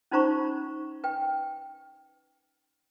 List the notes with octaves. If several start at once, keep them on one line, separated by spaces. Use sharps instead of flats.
C#4 D#4 F4 C5 A#5 C#6
B4 G5